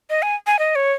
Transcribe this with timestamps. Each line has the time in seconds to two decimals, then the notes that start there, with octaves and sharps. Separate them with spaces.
0.10 D#5
0.22 G#5
0.47 G#5
0.59 D#5
0.76 C#5